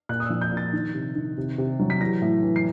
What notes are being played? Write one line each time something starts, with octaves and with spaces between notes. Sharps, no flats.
A#2 F#6
D#6
F3 E6
G6
A#2
A6
D#3
C3
D#3
C3
C3
F#3
B6
E3 A#6
A2
E3
C7